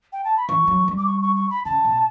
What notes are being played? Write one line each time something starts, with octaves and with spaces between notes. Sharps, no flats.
G5
A5
B5
E3 C#6
F#3
G3
D6
C#6
C#6
C#6
B5
C#3 A5
B2